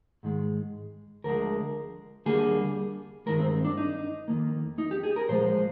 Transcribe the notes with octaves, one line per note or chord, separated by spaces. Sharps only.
G#2 D#3 G#3
D2 D3 F3 G#3 A#4
D#2 D3 G3 A#3 G#4
G2 D#3 G#3 A#4
C4
D4
D#4
F2 D#3 A#3
D#4
G4
G#4
A#4
A#2 F3 G#3 C5